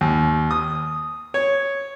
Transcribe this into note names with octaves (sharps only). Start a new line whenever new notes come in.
D#2
D#6
C#5